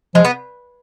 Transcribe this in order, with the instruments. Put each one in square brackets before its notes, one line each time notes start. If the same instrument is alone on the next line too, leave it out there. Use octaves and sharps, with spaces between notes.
[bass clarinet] F3 [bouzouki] G#3
[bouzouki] B3